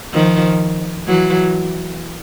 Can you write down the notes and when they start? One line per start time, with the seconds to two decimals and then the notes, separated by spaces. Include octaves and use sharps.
0.13 D#3 F3
1.07 E3 F#3